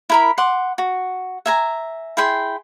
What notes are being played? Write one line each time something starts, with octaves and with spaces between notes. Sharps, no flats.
E4 A#4 B5
F#5 C6 D6
F#4
E5 G#5 A#5
E4 G#4 G5 C6